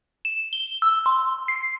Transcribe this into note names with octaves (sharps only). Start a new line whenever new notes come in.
E7
G7
E6
C6
C7